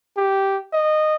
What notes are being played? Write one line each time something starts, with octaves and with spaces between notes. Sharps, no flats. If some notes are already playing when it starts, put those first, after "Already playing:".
G4
D#5